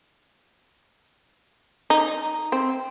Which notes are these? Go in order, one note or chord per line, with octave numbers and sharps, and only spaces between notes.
D#4
C4